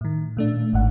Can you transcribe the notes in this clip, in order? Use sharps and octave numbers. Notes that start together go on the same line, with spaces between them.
A2 D#3
A#2 A3 D4
G#1 G#2 F#5